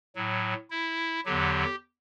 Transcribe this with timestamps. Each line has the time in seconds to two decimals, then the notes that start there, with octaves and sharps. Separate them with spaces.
0.15 A2 F#3
0.70 E4
1.25 E2 D3 F#3 G4